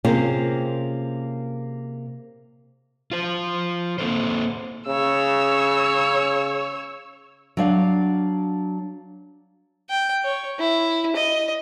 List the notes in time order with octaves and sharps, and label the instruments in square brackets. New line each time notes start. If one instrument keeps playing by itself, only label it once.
[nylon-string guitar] C3 A#3 C4 C#4 F4 G#4
[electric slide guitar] F4 C5
A#3 C4 A4 C5
[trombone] C#3 [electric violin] C#5 E6
[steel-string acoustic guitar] F#3 D4 F5
[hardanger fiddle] G5
C#5
E4
D#5